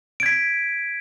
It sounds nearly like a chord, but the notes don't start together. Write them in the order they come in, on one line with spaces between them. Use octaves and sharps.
D7 G#6 B6